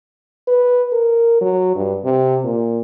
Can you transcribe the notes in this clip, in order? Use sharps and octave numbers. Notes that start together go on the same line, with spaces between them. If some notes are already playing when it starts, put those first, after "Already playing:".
B4
A#4
F#3
G2
C3
A#2